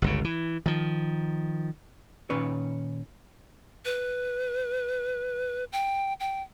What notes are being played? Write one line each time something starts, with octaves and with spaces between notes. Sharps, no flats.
G1 C#2 C#3
E3
D#3 F3
A#2 D#3 C#4 B4 C#5
B4
G5
G5